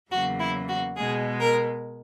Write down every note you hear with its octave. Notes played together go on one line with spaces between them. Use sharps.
E2 C#3 F#3 A#3 F#4
E4
F#4
B2 G#3 G#4
A#4